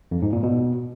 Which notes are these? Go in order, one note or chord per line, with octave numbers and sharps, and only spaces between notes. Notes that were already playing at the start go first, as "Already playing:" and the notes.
F2
G#2
A#2
B2